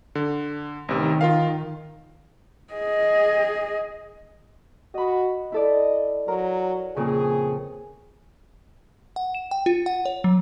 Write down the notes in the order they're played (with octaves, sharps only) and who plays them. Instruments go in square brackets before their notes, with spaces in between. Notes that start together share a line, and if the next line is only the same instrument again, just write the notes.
[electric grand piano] D3
[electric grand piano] A1 C3 [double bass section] D#3
[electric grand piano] F4 A#4 F5
[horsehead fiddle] G#4 D#5
[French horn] F#4 [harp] D#5 B5
[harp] E4 A4 D5 [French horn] D#5
[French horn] F#3 [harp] A#4 A#5
[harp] F2 A#2 C#3 [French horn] G#4
[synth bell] F#5
E7
G5
F4
F#5
C#5
F#3